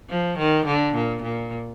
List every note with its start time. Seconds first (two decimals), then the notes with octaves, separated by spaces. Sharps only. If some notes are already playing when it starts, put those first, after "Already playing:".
0.10 F3
0.38 D#3
0.66 D3
0.95 A#2
1.23 A#2